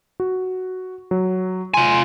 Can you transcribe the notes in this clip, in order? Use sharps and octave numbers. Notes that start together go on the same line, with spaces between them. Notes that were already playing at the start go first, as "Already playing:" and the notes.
F#4
F#3
F4 G#5 C6